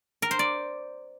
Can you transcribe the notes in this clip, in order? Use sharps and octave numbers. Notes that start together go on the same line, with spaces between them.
A#4
C5
D5